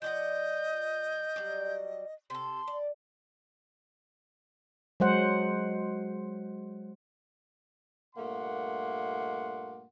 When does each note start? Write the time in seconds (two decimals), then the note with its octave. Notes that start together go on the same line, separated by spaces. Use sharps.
0.02 F3 D5 D#5 F#5 G6
1.36 F#3 G3 D5
2.30 C3 A4 C6
2.68 D5
5.00 F#3 G#3 C5 F#5
8.16 G2 A#2 A3 A#3 F#5 C6